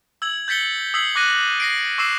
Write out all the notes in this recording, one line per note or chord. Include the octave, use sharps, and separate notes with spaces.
E6 G#6 F#7
G6 A6 B6 C#7 G7
D#6 E6 G#6 B6 C7 F#7
D6 F#6 A#6 D#7
A#6 C7 D7
C#6 D6 E6 C7 E7